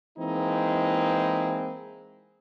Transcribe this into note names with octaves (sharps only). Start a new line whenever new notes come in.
E3 G#3 A#3 C4 D#4 E4